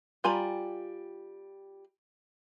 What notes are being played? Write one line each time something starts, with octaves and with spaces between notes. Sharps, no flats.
G3 F4 G#5 A#5 B5